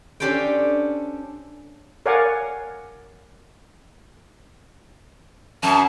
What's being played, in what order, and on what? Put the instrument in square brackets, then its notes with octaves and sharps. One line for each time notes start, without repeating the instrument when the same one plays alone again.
[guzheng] C#4 D4 G4 A4 C5 G5
[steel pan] A#4 C#5 D5 F5 F#5 G#5
[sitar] F#2 [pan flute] A5